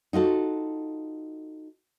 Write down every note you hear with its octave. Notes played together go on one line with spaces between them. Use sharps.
D#4 F4 F#4 A4